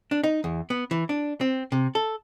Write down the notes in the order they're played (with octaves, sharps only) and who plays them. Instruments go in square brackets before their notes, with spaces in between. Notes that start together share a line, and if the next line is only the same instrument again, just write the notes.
[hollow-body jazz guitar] D4
D#4
E2
B3
E3
D4
C4
C3
A4